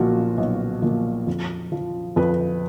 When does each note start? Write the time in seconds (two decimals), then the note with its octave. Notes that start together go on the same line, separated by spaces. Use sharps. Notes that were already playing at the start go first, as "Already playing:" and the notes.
Already playing: B1 A#2 F3 F4 F#4
0.37 B1
0.82 A#2 F3
1.27 F2
1.72 F3
2.16 F2 B4